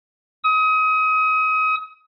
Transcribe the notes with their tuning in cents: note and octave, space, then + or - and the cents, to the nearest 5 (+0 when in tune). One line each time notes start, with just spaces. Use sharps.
D#6 +30